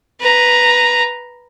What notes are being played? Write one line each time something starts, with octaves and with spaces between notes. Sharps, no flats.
B4 A#5